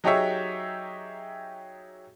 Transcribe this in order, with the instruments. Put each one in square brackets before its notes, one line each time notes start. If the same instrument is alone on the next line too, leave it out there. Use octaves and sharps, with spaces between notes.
[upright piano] F#3 D#4 G4 G#4 C#5 E5